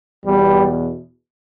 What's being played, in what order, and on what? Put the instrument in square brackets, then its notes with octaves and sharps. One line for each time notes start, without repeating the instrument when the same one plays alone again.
[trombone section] E2 B2 G3